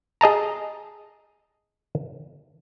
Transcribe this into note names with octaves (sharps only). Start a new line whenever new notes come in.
G#4 D#5 A5 A#5